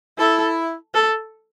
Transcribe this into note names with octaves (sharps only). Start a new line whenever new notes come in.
E4 A4
A4